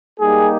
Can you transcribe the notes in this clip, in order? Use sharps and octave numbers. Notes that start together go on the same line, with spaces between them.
G3 A#3 D#4 G4 G#4